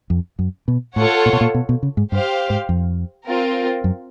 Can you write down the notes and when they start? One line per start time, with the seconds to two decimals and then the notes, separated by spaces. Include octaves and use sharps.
0.10 F2
0.39 F#2
0.68 B2
0.96 A2 F4 A4 C#5 F#5
1.26 A#2
1.33 B2
1.41 A#2
1.54 B2
1.69 B2
1.83 C#3
1.97 G#2
2.11 G2 G4 C5 F5
2.50 G#2
2.69 F2
3.27 C4 F4 A#4
3.84 F#2